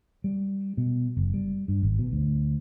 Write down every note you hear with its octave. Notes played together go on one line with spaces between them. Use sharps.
G3
B2
F#1
G3
G2
G#1
B2
D2